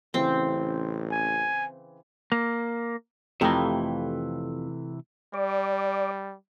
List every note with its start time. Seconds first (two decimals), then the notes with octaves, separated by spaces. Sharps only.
0.14 A1 C#3 E3 C4
1.11 G#5
2.32 A#3
3.41 F2 C3 E3 A3 E4 G4 A#5
5.34 G3 D5